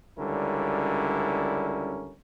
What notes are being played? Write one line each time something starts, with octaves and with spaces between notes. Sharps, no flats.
C#2 D3 G3 C#4 E4 A#4